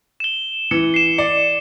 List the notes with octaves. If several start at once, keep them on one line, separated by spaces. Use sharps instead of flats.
E7 G7
E3 C#7
C7 E7
D5 C#7